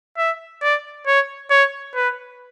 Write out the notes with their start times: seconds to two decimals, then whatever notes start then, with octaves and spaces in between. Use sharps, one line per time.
0.18 E5
0.62 D5
1.07 C#5
1.51 C#5
1.95 B4